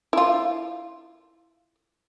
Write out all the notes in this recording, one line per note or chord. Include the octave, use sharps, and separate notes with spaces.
E4 F4